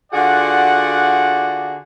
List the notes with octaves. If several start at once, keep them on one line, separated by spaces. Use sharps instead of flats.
D3 F4 F#4 G#4 D5 F#5